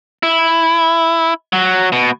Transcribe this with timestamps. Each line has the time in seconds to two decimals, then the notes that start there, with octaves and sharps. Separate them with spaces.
0.23 E4
1.53 F#3
1.92 B2